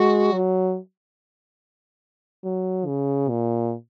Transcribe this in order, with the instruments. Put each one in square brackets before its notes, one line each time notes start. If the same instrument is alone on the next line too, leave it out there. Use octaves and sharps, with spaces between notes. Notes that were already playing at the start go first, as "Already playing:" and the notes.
Already playing: [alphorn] G#3 [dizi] F#4
[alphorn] F#3
F#3
C#3
A#2